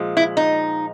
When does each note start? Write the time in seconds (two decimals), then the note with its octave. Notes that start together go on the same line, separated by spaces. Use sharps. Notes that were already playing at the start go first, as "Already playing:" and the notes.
Already playing: A#2 F3 G#3
0.17 E4
0.37 D#4